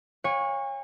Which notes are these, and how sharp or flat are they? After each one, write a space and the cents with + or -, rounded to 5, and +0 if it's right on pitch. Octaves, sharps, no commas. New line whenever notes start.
C#5 -10 F5 +40 G#5 -40